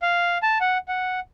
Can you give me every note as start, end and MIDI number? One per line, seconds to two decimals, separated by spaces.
0.02 0.38 77
0.43 0.58 81
0.61 0.78 78
0.88 1.20 78